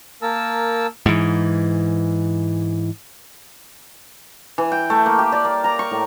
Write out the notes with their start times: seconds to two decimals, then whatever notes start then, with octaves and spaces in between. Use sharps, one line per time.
0.22 A#3 A#4 A5 E6
1.06 G#2 E3
4.58 E3
4.72 G5
4.90 A3
5.06 A#3
5.19 G4
5.32 D5
5.45 A#3
5.64 A#5
5.79 C#6
5.91 A2